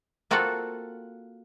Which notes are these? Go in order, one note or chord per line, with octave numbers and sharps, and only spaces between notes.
A#3 C4 F4 F#4 A4 F#5